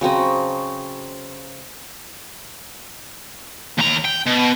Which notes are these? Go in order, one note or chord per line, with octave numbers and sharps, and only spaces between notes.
C#3 F#3 C4 D#5
D#2 A#5
G5
B2